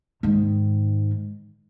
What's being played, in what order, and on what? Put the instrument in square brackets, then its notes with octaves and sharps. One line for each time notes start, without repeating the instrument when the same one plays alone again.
[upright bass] G#2 D#3